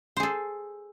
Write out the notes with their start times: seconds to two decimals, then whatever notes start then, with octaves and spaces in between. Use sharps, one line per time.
0.17 C5
0.20 G#4
0.23 A4